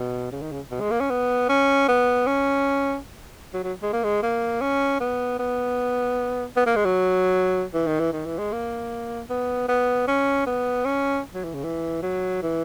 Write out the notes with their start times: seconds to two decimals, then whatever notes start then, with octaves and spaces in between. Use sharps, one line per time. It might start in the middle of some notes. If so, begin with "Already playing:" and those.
Already playing: B2
0.32 C#3
0.41 D#3
0.52 C#3
0.71 B2
0.80 G#3
0.90 A#3
1.00 C#4
1.10 B3
1.49 C#4
1.88 B3
2.27 C#4
3.54 F#3
3.64 F#3
3.83 G#3
3.93 A#3
4.03 G#3
4.23 A#3
4.61 C#4
5.00 B3
5.39 B3
6.56 B3
6.66 A#3
6.76 G#3
6.85 F#3
7.74 E3
7.87 D#3
7.99 E3
8.13 D#3
8.25 E3
8.38 G#3
8.52 A#3
9.29 B3
9.68 B3
10.08 C#4
10.46 B3
10.85 C#4
11.34 F#3
11.44 E3
11.54 C#3
11.64 E3
12.03 F#3
12.42 E3